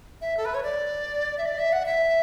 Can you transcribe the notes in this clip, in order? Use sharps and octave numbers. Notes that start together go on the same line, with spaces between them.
E5
A4
B4
C#5
D5
E5
D5
E5
F#5
E5